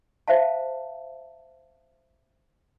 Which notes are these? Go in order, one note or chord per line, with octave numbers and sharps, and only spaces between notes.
C5 E5 F5 A5